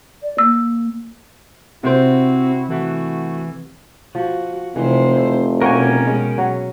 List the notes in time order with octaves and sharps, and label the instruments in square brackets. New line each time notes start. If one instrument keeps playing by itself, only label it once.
[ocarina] D5
[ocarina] A#3 [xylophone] E6
[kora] C3 C5 [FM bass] C4 [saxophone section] E4 F#4
[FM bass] E3 [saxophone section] A3 F#4
[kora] F3 [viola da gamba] F#4
[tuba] F1 [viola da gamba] C3 C5 [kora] E3
[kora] E4
[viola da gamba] B2 C#4 [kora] A#3 F#4 C#5 [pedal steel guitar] A#4 G5 G#5
[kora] G#3
F#3